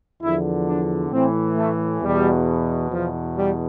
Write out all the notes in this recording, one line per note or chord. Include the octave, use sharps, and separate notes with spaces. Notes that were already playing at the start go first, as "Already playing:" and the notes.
E2 D3 F3 E4
D4
A2 E3 C4
A3
E2 B2 G3
E2 B2 F3
G3